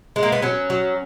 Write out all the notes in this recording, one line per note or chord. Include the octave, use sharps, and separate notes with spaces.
G#3
A#3
B3
F#3 C#4
F#3